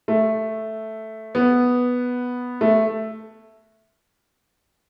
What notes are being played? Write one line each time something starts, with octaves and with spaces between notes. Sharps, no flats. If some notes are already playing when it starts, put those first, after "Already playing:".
A3
B3
A3